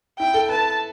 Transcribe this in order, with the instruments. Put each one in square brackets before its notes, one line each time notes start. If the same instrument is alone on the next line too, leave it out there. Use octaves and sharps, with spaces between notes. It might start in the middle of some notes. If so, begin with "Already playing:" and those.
[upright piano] E4 [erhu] G5
[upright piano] A4
[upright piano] B4 [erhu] A5